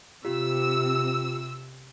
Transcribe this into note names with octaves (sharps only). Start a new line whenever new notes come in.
C3 F4 G4 E6